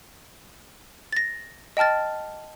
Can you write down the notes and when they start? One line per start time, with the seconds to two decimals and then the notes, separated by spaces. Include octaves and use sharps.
1.13 A6 A#6
1.77 D#5 G5 A5 F6 A6